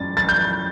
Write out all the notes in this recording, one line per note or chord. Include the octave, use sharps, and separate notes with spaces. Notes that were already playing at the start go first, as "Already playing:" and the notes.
Already playing: F#2 G3 A6
A6
G6